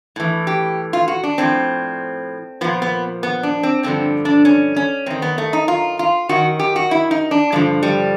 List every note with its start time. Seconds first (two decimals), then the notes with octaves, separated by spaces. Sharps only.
0.16 A2 E3
0.47 G4
0.93 F4
1.08 F#4
1.24 D4
1.38 A2 F3 C4
2.61 A#2 F3 B3
2.82 B3
3.23 B3
3.43 D4
3.63 C4
3.83 G2 D3 F3 C4
4.25 D4
4.45 C#4
4.76 C#4
5.06 F#2 D#3 C4
5.22 B3
5.38 A3
5.53 D#4
5.68 F4
5.99 F4
6.29 F#2 D#3 F#4
6.59 G4
6.76 F#4
6.91 E4
7.11 D#4
7.31 D4
7.52 G2 D3 F3 G#3
7.83 G3